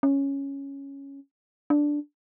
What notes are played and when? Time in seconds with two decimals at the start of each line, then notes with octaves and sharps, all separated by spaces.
0.03 C#4
1.70 D4